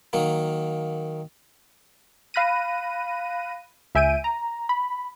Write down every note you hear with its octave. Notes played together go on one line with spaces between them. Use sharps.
D#3 F#3 A#3
F5 B5 F#6 A#6 D#7
C#2 E5 G#5 G6 D7 D#7
A#5
B5